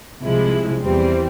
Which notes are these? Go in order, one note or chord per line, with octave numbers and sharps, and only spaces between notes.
C2 C3 F3 G#3 E4
E2 E3 G3 C4